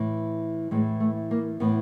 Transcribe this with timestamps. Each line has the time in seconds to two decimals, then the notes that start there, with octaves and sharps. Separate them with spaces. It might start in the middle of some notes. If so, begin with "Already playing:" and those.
Already playing: A2 E3
0.71 A2 E3 G#3
1.00 A3
1.31 A#3
1.60 A2 E3 B3